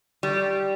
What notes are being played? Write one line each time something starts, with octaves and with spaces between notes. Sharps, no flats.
G3